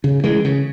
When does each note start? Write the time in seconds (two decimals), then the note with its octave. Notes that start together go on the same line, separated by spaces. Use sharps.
0.04 C#3
0.24 E3 G#3
0.45 C#3